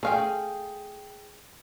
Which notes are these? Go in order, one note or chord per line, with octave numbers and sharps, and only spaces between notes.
A3 G#4 F5 G5 G#5